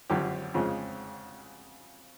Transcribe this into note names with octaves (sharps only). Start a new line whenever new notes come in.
G#1 F#2 D3 F3 G4
F2 C#3 F3 G#3